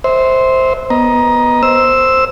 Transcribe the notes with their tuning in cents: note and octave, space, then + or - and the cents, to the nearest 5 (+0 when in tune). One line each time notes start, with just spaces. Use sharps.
C5 +0 E5 -25
B3 -5 D#5 +0 A#5 +20
C5 +0 E6 +0